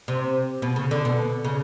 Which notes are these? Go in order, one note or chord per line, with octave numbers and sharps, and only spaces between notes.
C3
B2
C#3
D3
B2
C#3